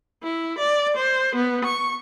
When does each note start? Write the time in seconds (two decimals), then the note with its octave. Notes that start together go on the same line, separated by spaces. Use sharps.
0.24 E4
0.59 D5
0.97 C5
1.36 B3
1.65 C#6